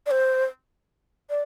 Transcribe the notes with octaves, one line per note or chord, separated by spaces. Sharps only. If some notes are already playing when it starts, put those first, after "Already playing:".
D5
C5
D5